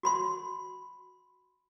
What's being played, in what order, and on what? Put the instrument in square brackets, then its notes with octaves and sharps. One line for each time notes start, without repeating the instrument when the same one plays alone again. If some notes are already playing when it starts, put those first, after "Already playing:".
[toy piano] F#4 B5 C6